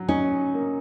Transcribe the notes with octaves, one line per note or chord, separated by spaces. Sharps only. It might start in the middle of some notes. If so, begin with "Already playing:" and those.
Already playing: F#3
C#4 D#4
A#3